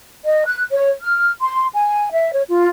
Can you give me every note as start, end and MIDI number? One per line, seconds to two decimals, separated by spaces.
0.24 0.46 75
0.46 0.62 90
0.72 0.91 73
1.01 1.30 89
1.41 1.67 84
1.74 2.07 80
2.11 2.30 76
2.32 2.43 73
2.48 2.68 65